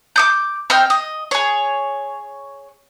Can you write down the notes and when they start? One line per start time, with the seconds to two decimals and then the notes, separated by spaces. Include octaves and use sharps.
0.16 D6 D#6 G6
0.70 C4 D#5 G5 F6
0.90 D#5
1.31 G#4 C#5